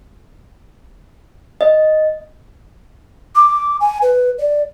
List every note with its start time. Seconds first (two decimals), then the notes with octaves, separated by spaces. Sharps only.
1.61 D#5
3.35 D6
3.80 G#5
4.02 B4
4.38 D5